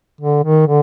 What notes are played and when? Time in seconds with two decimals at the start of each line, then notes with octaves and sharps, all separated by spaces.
0.21 D3
0.44 D#3
0.67 D3